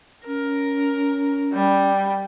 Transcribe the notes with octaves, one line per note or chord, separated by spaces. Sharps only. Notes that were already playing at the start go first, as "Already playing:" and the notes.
C#4 A#4
G3